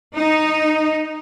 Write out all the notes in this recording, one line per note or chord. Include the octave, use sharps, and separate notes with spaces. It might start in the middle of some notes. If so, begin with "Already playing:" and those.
D#4